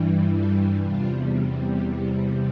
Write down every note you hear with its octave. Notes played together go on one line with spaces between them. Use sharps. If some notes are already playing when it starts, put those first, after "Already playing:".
Already playing: G2 E3 G3
F4 A4
E2 C3 G3 D4 F4